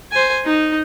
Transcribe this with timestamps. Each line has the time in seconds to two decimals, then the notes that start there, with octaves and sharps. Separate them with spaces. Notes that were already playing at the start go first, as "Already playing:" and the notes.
0.12 C5 G#5
0.45 D#4